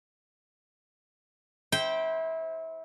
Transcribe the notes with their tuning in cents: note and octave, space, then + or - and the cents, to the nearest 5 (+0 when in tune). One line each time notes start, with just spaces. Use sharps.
E4 -25 C5 +0 G5 -5